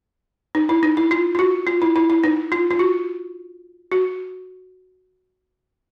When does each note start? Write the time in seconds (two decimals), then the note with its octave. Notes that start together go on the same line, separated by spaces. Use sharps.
0.55 D#4
0.69 E4
0.83 D#4
0.97 E4
1.11 F4
1.35 F4
1.39 F#4
1.67 F4
1.82 E4
1.96 E4
2.10 E4
2.24 D#4
2.52 F4
2.71 F4
2.79 F#4
3.92 F#4